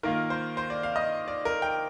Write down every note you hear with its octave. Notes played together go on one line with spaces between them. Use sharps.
D#3 A#3 F4 A#4
C5
C5
D5
F5
D#5
D5
A#4
G5